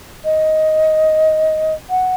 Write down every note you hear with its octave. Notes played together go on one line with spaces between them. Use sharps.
D#5
F#5